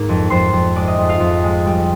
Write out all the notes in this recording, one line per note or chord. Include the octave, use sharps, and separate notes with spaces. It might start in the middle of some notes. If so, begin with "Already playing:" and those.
Already playing: G#2 A#3
F2
F2 C5 C6
F2
G#3 D5
D#5
F2
F4 F5
F2
G#3
G3